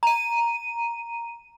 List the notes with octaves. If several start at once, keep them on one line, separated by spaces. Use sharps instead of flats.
A#5 D#7